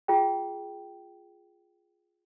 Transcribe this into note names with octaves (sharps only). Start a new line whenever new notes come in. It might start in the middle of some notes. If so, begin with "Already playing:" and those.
F4 G#4 G5